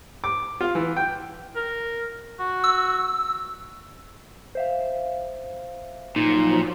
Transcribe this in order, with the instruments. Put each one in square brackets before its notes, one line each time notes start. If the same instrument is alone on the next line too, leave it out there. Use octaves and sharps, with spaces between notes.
[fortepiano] D6
F4
E3
G5
[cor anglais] A#4
F#4
[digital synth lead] E6
[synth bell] C5 E5 F5
[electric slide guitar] A#2 [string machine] F3 F#3 [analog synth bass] D#4